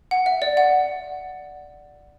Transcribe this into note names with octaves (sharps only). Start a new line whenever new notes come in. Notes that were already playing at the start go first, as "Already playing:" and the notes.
F#5
E5
D5
F#5